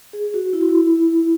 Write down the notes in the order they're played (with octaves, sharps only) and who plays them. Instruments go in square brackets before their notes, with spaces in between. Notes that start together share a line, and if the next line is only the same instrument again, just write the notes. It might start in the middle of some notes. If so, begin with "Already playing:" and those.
[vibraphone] G#4
F#4
E4
F#4
E4